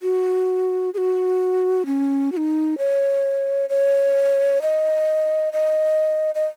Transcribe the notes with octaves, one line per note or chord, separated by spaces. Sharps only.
F#4
G#4
F#4
C#4
F#4
D#4
C#5
C#5
D#5
D#5
D#5